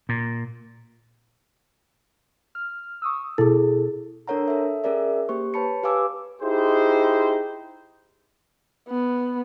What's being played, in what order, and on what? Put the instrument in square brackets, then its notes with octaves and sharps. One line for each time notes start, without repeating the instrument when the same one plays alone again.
[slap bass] A#2
[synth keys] F6
C#6 D#6 E6
[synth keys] B2 A4 [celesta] E4 G#4
[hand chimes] D4 A4 A#4 C#5 F#5 A#5
A4 E5
C#4 G#4 A#4 D5 E5
A#3 G4 C5 C#6
B4 C#5 A5 B5 C#7
G4 B4 F5 G#5 D6 E6
[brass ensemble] D#4 E4 G4 G#4 C5
[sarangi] B3